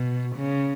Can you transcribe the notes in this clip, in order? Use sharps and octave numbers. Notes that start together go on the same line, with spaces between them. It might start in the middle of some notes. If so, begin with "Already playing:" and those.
Already playing: B2
C#3